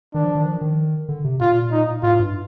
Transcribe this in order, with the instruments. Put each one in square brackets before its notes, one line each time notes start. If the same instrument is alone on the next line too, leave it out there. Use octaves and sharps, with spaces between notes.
[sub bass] D#3 [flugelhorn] D4
[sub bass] F3
D#3
F3
D#3
D3
C3
[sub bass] A#2 [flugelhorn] F4
[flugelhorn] D#4
[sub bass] A2 [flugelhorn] F4
[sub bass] G2